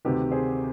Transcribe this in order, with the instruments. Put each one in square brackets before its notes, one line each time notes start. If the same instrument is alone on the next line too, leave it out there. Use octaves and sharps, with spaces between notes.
[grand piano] D2 C3 D#3 G4 B4
G#4 C5